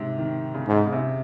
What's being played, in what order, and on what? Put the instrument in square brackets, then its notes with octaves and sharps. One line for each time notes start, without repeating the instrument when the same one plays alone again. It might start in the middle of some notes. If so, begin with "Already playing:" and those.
Already playing: [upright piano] G#2 C3
D#3
C#3
[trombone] G#2
[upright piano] C#3
C3